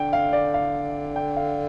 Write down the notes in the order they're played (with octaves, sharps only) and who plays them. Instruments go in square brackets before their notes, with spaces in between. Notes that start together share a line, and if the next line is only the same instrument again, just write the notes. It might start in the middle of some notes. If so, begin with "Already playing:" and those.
Already playing: [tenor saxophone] D3 [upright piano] G5
[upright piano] F5
D5
F5
G5
F5